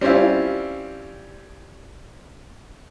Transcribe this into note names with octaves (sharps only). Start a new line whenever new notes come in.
G3 C4 C#4 E4 F4